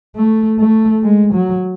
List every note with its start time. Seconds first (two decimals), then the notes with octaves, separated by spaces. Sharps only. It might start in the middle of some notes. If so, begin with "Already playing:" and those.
0.16 A3
0.59 A3
1.04 G#3
1.34 F#3